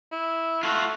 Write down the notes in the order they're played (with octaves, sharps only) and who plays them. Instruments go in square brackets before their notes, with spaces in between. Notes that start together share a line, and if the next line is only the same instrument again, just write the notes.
[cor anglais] E4
[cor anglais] A3 [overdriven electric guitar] F4 F#4